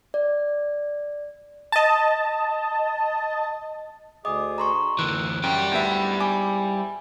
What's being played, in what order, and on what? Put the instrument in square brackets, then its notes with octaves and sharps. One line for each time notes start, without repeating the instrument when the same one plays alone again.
[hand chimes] D5
[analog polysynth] D#5 A5
[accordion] D2 G#4 D#6 [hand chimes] D#5 D6
[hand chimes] A#5 C6 C#6
[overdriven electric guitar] D2 E3 [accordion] D#3 C6 E6 [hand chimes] F#6
[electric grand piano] F#2 [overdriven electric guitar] G3 G5 [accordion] F#4
[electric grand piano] D2 B3 E5 [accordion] G#2 E4
[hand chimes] G#5 [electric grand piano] D6